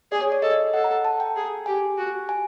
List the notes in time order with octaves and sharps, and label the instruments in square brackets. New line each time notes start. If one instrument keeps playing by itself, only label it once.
[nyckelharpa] G#4 [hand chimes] D5
[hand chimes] C#5
D5
[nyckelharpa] A4 [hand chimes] D#5
[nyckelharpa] A4 [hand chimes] F#5
[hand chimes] A#5
A5
G5
[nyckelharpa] G#4
[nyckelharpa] G4 [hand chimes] G#5
[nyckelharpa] F#4
[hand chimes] G#5